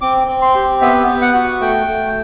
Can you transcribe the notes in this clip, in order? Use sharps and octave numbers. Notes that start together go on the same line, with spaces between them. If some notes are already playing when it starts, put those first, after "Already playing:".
C4 D6
C4
C6
G4
B3 E5
B3
F#5
F#4
A3 G5
A3